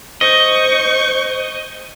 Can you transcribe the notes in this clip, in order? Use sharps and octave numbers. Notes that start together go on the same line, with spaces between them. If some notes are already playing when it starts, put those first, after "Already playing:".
C5 D#5 C#6 G6